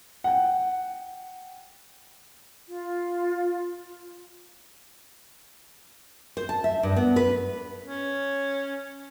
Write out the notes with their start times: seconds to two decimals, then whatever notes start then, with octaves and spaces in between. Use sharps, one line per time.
0.24 F#5 G5
2.67 F4
6.37 C5
6.49 A5
6.64 E5
6.83 G2
6.96 B3
7.16 B4
7.82 C#4